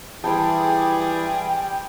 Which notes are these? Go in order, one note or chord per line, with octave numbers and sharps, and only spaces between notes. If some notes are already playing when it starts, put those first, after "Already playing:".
E3 G3 G#4 D5 G5 A5 B5 C6